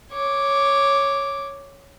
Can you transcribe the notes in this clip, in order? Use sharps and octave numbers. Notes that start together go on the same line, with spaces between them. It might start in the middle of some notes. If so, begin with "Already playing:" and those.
C#5 D6